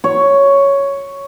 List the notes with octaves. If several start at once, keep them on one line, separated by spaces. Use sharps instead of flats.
C#5